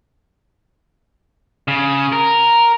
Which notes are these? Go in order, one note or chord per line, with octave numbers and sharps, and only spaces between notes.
C#3
A#4